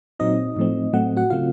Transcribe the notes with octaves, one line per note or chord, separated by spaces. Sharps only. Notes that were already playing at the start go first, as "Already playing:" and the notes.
A#2 F#3 C4 D#4 D#5
A2 F3 A3 C4
A2 F#3 A3 C4 F#5
F#4 F#5
C#3 A3 C4 F4 F5